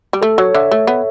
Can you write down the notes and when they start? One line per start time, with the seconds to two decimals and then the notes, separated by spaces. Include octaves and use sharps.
0.13 G3
0.22 A3 A4
0.38 F#3 C#5
0.55 D3 E5
0.71 A3
0.87 B3